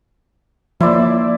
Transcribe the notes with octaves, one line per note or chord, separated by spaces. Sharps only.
F3 A#3 E4 C5 D5